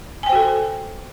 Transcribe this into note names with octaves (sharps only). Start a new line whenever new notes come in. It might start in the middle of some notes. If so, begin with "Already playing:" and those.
F#4 A4 C5 G5 G#5